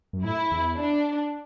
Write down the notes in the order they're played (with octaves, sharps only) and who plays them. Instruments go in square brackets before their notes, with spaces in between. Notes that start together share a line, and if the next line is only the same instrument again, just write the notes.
[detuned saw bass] F#2
[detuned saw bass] A2 [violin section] E4
[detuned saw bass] E2
[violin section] D4